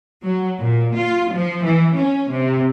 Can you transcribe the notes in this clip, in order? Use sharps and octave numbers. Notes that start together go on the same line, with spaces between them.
F#3
A#2
F4
F3
E3
C#4
C3